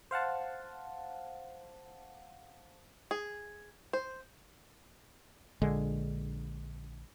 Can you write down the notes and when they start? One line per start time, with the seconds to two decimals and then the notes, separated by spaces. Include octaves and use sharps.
0.11 C5 F5 F#5 A5
3.11 G#4
3.93 C5
5.62 A#1 D3 G#3